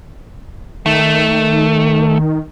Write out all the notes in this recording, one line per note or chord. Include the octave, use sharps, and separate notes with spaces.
D#3 A3